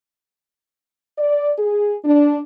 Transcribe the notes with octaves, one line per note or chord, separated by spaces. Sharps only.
D5
G#4
D4